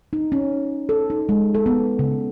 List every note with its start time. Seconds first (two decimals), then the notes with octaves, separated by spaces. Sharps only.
0.13 D#4
0.32 C#4
0.89 A4
1.10 D#4
1.29 G#3
1.55 A4
1.66 B3
1.99 C#3